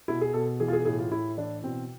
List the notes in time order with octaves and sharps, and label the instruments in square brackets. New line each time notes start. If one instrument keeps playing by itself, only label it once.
[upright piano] B2 E4
G#4
B2 A4
E3 G#4
F4
G#4
A2 G#4
F4
A2 E4
E3 D4
B2 C4